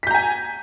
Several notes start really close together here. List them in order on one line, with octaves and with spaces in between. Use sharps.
B6 G6 A#5 G#5